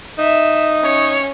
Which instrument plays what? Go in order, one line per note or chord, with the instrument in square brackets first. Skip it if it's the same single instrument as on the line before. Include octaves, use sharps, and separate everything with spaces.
[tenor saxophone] D#4 [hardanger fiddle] E5
[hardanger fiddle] C#4 [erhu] C#5